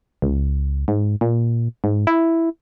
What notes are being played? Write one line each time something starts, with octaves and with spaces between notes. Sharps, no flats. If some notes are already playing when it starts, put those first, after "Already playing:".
C#2
G#2
A#2
G#2
E4